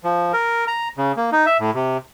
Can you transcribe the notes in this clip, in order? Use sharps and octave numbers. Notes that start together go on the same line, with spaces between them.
F3
A#4
A#5
C#3
A#3
D#4
E5
A2
C3